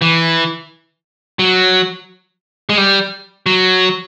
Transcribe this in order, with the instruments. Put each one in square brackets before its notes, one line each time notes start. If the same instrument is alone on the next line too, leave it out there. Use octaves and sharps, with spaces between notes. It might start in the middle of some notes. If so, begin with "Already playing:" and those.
[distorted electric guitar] E3
F#3
G#3
G3
F#3